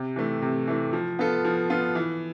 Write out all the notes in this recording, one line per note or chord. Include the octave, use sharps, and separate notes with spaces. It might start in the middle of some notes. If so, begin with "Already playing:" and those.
Already playing: C3
E3 A3
C3
E3 A3
F3
B3 F4 A4
F3
B3 F4 A4
E3